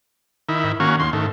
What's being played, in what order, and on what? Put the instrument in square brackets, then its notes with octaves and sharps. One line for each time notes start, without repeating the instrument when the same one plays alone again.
[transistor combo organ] D#3 E4
[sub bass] G#2
[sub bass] D#3 [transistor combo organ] A#3 C#4 F#4
[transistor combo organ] D#2 C6
[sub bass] G#2 [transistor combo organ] D#3 A3